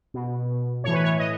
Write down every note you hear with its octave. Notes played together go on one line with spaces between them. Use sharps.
B2
A2 E3 C#5
B4
C#5
D#5